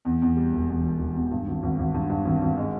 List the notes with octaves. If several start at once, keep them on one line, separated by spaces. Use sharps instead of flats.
E2
E2
G3
E1
E2
E1
E1
E2
G2
G#1
G#1
G#1
G2
G2
G#1
G#1
G#3